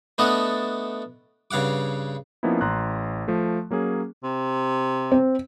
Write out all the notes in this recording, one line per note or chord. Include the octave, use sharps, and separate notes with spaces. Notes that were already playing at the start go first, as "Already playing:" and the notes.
A3 B3 D4 A4 D#5 F#5
G2 C#3 F5 F#5 D6
F3 A#3 B3 C#4 D#4 E4
A1 A#5 C6 F#6
F3 A3
F#3 A#3 C#4 G#4
C3
C4